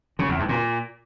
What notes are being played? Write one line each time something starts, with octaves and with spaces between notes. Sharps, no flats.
C#3
E2
G2
A#2